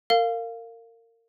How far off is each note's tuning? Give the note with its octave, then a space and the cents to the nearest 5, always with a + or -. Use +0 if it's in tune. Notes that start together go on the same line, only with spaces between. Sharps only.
A#4 -30 F5 +0